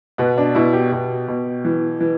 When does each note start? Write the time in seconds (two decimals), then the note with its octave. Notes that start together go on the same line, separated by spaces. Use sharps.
0.18 B2 B3
0.38 D4
0.55 B2 E4
0.73 G4
0.92 B2
1.28 B2
1.65 E3
2.00 E3